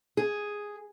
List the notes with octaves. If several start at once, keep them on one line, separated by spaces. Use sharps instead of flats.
G#4